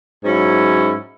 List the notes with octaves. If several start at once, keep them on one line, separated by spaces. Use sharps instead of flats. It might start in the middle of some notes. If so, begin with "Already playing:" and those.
G#2 F#3 C#4 E4